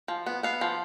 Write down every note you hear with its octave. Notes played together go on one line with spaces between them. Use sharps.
F3
B3
B3 F5
F3